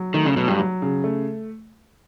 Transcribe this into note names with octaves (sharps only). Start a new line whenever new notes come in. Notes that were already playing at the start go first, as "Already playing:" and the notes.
Already playing: F#3
D#3 A3
C#3
B2 F#3
G2
F#3
C#3
A3